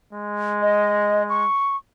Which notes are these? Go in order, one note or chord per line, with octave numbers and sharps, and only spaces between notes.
G#3
D#5
C#6